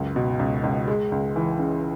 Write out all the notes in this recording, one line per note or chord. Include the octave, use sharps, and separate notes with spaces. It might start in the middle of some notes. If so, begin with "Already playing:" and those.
Already playing: C#2 F#2
B2
C#2
C#2
G#3
C#2
E3
C#3